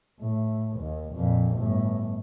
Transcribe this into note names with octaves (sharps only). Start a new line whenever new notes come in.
A2
D#2
F2 A#2
G1 A2